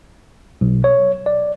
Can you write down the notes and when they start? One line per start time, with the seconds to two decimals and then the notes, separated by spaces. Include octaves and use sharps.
0.61 B1
0.84 C#5
1.26 D5